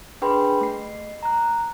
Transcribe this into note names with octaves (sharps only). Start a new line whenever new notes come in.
D4 G#4 B4 G5 B5 C6
A3 C7
A#5 F#6